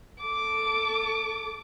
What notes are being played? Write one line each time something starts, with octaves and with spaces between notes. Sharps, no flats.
A4 D6